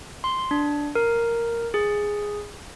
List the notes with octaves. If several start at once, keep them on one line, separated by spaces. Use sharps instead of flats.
C6
D4
A#4
G#4